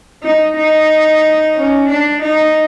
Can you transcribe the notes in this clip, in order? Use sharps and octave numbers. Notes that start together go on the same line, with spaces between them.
D#4
D#4
C#4
D4
D#4